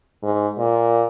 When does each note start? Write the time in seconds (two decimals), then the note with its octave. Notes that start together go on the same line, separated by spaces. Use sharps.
0.23 G#2
0.58 A#2